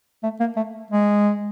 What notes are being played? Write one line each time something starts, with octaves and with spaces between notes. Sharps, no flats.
A3
A#3
A3
G#3